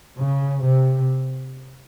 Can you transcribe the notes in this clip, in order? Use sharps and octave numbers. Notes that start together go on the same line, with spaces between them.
C#3
C3